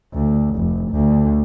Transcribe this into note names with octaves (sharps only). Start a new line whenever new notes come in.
D2
F1
D2